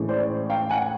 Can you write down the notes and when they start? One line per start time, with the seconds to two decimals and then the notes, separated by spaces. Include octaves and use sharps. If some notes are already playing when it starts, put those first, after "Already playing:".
Already playing: A2 E3 G#3 C#4
0.09 C5 D5
0.50 F5 G5
0.69 F#5 G#5